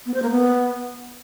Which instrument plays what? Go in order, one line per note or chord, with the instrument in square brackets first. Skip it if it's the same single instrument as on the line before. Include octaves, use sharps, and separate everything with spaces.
[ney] B3
C5
A#3
B3